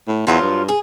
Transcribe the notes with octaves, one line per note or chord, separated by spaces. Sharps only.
A2
E2 F3 F#3 F4
G2
G#4